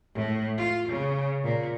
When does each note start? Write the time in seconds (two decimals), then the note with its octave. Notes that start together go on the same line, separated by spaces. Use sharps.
0.15 A2
0.58 F4
0.88 C#3
1.44 A#2